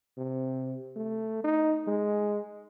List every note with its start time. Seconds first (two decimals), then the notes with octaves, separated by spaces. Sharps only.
0.17 C3
0.96 A3
1.44 D#4
1.87 G#3